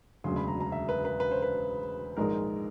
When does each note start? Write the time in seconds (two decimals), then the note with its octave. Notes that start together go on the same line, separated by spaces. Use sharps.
0.24 E1 D2 C#3 F#3 C6
0.36 B5
0.48 A#5
0.61 A#5
0.72 E5
0.89 B4
1.05 B4
1.20 B4
1.31 C5
1.42 B4
2.17 A#1 G#2 D#3 G#3 A#4